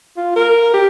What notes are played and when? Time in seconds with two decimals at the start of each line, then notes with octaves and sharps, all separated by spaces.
0.17 F4
0.36 A#4
0.73 G4